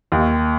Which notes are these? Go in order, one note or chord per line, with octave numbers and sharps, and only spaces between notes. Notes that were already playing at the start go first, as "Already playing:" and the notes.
D#2